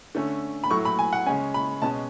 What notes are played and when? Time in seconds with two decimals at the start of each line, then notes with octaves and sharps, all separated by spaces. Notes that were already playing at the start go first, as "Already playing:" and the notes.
0.15 D3 A3 C#4
0.64 B5
0.70 A2 F#3 A3 C#6
0.85 B5
0.99 G#5
1.13 F#5
1.26 C#3 G#3 C#4 G#5
1.54 B5
1.82 B2 G#3 C#4 A5